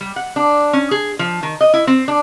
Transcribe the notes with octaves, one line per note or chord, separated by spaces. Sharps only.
G3
F#5
D4
C#4
G#4
F3
D#3
D#5
E4
C4
D4